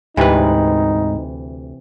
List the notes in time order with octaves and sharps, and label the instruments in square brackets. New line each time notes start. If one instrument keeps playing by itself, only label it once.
[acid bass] D2 [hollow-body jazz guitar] G#2 B4 [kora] C3 E3 [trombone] D#4